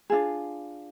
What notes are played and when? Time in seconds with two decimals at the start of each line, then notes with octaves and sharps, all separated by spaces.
0.10 D4 F4 G#4